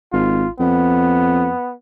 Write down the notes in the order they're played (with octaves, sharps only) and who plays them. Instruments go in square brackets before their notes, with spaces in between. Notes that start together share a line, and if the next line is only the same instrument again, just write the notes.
[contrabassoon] G#1 [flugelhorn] F4
[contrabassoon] F2 [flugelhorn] B3